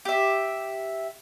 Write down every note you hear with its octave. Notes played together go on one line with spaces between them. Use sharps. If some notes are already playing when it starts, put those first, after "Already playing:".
G4 E5